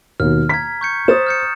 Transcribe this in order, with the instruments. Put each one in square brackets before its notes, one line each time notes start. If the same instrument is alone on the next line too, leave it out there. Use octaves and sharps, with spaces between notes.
[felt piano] D#2 B2 [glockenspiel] F6
[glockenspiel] A#5 F6 G#6 [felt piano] B6
[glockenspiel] C#6 G6 C#7
[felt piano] C5 [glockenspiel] D#6 A6 E7
[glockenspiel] F6 G6 C#7